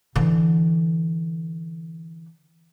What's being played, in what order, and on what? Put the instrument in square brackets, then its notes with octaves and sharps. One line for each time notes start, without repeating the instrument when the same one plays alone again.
[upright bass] D3 E3